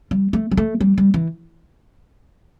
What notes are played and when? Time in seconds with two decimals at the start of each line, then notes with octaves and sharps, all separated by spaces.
0.11 G3
0.33 A3
0.51 G3
0.57 A3
0.81 G3
0.98 G3
1.14 E3